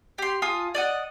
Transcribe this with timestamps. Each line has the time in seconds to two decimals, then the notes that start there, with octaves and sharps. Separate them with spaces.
0.18 G4 C6
0.42 F4 G#5 A5 D#6
0.75 D5 D#5 F#5